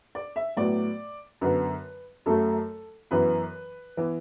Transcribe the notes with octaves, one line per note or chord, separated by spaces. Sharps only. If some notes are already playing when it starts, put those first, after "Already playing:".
D5
E5
A2 F#3 B3 D5
F#2 D3 B3 B4
F#2 F#3 A3 A4
F#2 E3 B3 B4
E3 B3